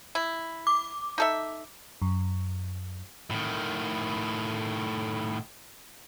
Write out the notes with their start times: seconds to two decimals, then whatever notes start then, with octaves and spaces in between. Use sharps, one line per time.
0.15 E4
0.67 D6
1.18 D#4 A4 E5
2.02 F#2
3.30 A2 D#3